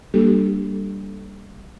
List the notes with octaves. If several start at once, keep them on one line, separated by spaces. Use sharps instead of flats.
G3 A#3 D4 G4 A4